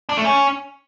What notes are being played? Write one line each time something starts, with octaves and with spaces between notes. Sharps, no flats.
D4
A3
C#4